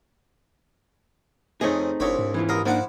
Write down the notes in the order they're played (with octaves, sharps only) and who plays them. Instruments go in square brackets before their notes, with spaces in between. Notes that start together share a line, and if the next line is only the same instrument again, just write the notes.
[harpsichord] F2 C#3 D#5 [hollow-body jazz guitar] A3 G#4 [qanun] C4 D#4
[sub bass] G1 [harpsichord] C2 C#5 B5 [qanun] C4 D4
[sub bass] G#2
[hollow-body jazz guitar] E2 E3 [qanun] C#4 E4 F4
[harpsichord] C2 A#4 D#6 [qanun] C6
[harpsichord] F3 F#5 D6 [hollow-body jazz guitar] A#3 D4 D#4